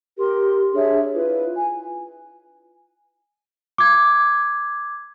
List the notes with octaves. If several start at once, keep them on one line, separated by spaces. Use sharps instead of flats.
G4 A#4 C6
D4 G#4 C#5 E5
E4 F4 B4
G#5
D6 G#6